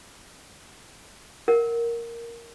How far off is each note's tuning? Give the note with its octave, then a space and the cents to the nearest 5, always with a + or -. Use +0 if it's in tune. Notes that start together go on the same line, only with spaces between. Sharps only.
A#4 +0 F#5 +0